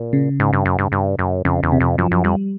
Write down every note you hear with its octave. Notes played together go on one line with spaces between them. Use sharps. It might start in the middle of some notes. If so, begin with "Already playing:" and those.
Already playing: A#2
C#3
G#2
G2
F#2
G2
G2
F#2
F2 C#3
E2
C3
F2
F#2 F3
F#2
F2 G3